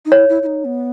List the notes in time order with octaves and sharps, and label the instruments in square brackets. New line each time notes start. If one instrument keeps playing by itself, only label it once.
[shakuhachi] D#4
[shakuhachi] E4 [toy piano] C#5
[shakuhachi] E4
E4
D#4
B3